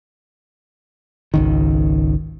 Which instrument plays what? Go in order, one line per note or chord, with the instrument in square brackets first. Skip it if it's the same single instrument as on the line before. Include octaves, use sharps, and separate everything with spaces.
[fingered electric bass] G#1 C#2 D#3